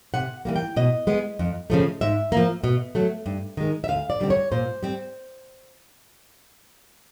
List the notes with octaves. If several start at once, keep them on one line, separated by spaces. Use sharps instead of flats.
C3 F#5
E3 G3 A#3
G5
B2 D#5
G#3 B3
F2
C#3 F3 A3
G#2 E5
F3 A#3
B2
F#3 A3
G2
D#3 G#3
E5
D2 F5
D5
D3 G3 C4
C#5
A#2 C5
G3 C4